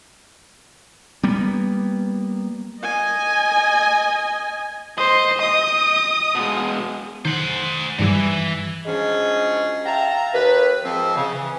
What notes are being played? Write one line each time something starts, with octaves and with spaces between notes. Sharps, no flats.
G3 A#3 B3
D#5 G#5
C5 D#5
D#6
B2 G#3
D#3 C5 F#5
G2 D#3 E3 G3
F3 F#3 G#3 C#4 D4 G#4
E5 F5 G5 A5 A#5
D#2 B4
G#2 F3 C4
C#3
E3